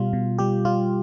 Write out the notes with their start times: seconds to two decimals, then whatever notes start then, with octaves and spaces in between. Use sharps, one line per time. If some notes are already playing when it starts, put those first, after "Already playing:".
Already playing: B2 G3 F4
0.13 B2
0.38 G3 G4
0.65 G3 F4